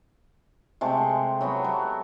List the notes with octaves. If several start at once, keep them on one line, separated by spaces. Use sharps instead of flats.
C3 G#3 A3
F#3 B3 F#4 G5
F#3